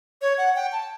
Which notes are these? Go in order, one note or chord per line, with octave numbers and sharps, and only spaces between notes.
C#5
F#5
G5
A5